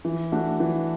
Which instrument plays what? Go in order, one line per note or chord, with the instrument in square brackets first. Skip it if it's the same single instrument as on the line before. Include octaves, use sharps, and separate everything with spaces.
[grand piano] E3
A3 D4 F#4
E3